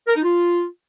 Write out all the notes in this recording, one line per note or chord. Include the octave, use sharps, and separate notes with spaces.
A#4
D#4
F4